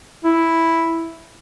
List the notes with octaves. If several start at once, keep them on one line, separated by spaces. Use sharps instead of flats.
E4